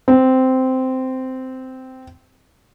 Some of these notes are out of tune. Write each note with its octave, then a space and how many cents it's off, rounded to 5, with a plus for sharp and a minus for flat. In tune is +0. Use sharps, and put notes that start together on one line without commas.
C4 -10